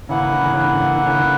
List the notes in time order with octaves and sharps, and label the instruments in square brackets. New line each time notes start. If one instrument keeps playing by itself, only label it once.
[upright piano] C#3 E3 [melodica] A#3 E4 B4 F#5
[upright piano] C#3
D3
C#3 E3
C#3
D3
C#3
D3
C#3 E3
D3